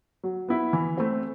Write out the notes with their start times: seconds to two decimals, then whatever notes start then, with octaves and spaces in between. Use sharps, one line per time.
0.23 F#3
0.48 B3 E4
0.73 E3
0.98 A3 C4